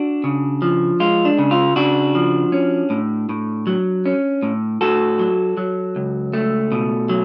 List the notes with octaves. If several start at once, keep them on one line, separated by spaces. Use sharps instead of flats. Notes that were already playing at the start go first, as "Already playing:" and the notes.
Already playing: D4 F#4
C#3
F3
G#3 F4
D4
C#3
F4
C#3 D4 F#4
F3
C#4
A2
A2
F#3
C#4
A2
A2 F#4 A4
F#3
F#3
C#2
A3
B2
F#3